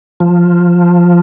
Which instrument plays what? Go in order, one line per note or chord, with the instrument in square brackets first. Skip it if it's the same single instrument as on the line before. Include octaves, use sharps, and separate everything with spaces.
[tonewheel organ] F3